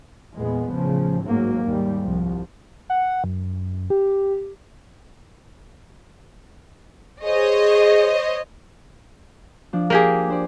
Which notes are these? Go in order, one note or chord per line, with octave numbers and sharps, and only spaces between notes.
E2 A#2 G#3 B3
A1 C#3 F3
G#2 F#3 A#3
D#2 G#2 G3
C2 F3
F#5
F#2
G4
G#4 C5 C#5 D#5
F3 D4
A#3 G4 G#4
D4 C5 D5